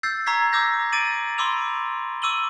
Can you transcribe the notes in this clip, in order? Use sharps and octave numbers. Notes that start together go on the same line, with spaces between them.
E6 G6 A6 C7
A#5 C#6 E6 G#6 B6 C7
D6 E6 G6 A#6
D6 A6 D7 D#7 F#7
B5 C6 D6 E6 F7
C#6 D6 E6 D#7 F#7 G7